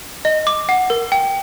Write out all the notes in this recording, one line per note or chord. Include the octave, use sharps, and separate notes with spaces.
D#5
D6
F#5
A#4
G5